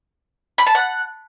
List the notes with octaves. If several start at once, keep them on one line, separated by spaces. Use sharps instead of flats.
B5
A5
F#5